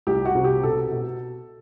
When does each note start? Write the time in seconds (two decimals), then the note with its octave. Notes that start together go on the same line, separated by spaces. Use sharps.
0.07 C2 G4
0.25 F#4
0.35 C3
0.44 G4
0.63 B2 A4
0.91 B2